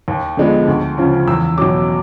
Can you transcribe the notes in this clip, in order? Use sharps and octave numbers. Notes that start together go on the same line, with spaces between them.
D#2
D3 F3 G#3 B3
D2
C#3 F3
E2 E6
B2 F#3 D6